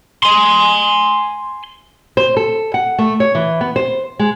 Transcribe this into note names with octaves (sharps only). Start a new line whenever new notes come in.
G#5 C6
C5
A4
F#5
A3
C#5
E3
B3
C5
G#3